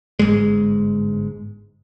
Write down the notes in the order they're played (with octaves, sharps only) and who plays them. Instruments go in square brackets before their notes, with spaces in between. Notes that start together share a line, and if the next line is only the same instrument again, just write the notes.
[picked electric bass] G1 G#2 G#3